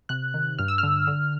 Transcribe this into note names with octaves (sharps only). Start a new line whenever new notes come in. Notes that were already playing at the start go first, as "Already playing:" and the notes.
C3 F#6
D#3
G2 F6
E6
D3 F6
D3